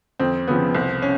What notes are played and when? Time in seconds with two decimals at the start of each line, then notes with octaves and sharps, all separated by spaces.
0.19 F2 C4
0.48 C#3 F3 B3
0.75 C2 C4
1.02 C#4